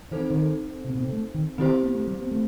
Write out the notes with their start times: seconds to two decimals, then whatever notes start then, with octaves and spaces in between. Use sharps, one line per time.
0.11 E3 C4 D#4 A4 C5
0.30 D#3
0.85 C3
0.95 B2
1.04 C3
1.13 A3
1.34 D#3
1.58 D#3 C4 E4 G4 C5
1.83 B3
1.95 A3
2.07 G3
2.19 B3
2.31 A3